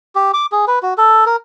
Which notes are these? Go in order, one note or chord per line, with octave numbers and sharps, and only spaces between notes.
G4
D6
G#4
B4
F#4
A4
A#4